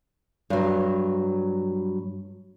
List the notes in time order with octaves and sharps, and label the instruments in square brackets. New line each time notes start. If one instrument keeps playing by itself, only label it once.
[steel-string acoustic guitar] G2 F#3